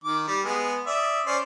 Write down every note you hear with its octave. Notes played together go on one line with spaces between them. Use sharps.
D#3 D6
G3
G#3 B3 G#4
D5 E5 D#6
C#4 C5 D5